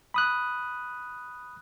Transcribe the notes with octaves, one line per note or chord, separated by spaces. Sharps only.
B5 D#6 F#6